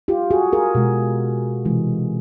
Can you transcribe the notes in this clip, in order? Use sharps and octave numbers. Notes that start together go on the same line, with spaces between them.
F4 G4
F#4 G#4
G#4 A#4
B2 G#3
C3 E3 G#3